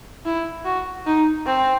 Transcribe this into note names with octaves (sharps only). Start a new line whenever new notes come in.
E4
F#4
D#4
C4